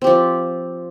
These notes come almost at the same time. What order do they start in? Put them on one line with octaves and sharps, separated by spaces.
C4 G4 F3